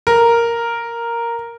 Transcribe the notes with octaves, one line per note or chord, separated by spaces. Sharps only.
A#4